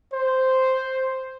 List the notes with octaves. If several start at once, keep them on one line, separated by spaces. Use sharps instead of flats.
C5